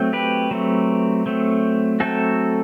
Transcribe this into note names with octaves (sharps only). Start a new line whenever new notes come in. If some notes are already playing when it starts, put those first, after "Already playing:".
Already playing: F#3 A3 C4
G4 B4
F#3 A3 C4
F#3 A3 C4
F#3 A3 C4 F#4 A4